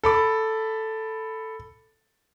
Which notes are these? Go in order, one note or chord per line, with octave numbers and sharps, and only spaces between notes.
A4 B5 D6